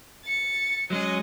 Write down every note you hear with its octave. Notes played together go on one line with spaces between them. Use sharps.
A6 C#7
F#3 G#3 C#4 D#5